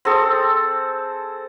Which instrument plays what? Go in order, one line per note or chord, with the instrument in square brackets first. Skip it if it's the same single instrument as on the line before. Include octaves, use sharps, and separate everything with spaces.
[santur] C4 G#4 A4